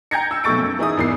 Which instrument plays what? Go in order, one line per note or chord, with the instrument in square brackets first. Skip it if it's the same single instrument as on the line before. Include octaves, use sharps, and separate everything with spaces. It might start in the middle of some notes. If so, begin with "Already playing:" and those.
[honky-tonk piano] G5 A#5 G6 G#6 A#6 C#7
E6
B1 B2 A3 C#6 A6 D7
F#2
E3 D#4 E4 G#4 D#6
G#1 E2 C7